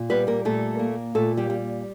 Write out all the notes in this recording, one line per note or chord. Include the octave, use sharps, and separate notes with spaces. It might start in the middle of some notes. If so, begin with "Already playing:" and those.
Already playing: A#2
G3 B3 B4
A#3 A#4
A#2 A3 A4
A#3
A#2 A3 A4
G3 G4
G3